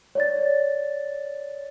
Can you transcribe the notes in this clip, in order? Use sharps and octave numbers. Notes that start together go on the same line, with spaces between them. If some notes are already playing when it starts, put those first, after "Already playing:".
C#5 D5 A6